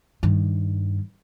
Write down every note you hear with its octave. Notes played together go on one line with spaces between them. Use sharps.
G2 D#3